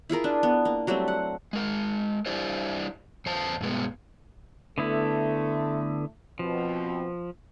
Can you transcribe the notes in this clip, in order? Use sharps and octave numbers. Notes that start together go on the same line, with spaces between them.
E4 F4 G#4 A#4
D4
B3
A#3
F#3 G3 A3 C4
F#5
G#3 A#4
G3 D4 E4 G4 C5
E2 C5 A5
G2 B2 G#3 B3
D3 A3 B3 E4
B2 F3 C4